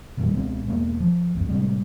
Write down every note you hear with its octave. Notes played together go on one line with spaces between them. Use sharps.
F2 A#2 D#3 G3
C#2 B2 G#3 C4
E2 B2 G#3 A#3
F3
C#2 F#2
A2 C3 G3 G#3